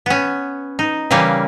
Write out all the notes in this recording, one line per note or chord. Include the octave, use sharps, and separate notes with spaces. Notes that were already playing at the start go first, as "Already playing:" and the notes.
B3 C#4
D#4
C#3 E3 G3 A#3 C#4